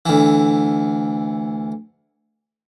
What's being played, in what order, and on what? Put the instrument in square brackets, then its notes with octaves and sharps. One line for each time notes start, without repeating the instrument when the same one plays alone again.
[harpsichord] D2 E3